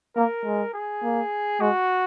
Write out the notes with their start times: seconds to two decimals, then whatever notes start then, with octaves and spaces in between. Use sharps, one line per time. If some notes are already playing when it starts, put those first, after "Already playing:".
0.16 A#3 A#4
0.45 G#3
0.74 G#4
1.03 A#3
1.61 G#3 F#4